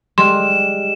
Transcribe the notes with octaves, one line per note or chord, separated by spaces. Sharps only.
G3 G#3 C6 E7